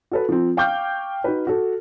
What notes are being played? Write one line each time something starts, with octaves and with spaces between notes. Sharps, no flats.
F#4 A4 B4
F3 C4
F5 G5 C#6 D6 F6 G6
D#4 F#4 B4
F#4 A4